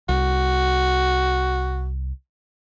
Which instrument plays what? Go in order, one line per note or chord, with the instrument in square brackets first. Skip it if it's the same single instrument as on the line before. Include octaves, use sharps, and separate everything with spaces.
[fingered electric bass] C2 [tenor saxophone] F#4